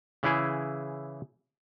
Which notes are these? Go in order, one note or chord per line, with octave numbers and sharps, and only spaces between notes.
C#3 E3 E4 G#4